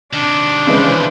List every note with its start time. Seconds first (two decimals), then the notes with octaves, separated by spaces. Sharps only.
0.13 C3 D#3 D4
0.67 C#3 E3 G#3 B4 C5